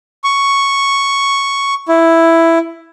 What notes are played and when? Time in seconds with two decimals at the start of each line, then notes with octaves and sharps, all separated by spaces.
0.24 C#6
1.88 E4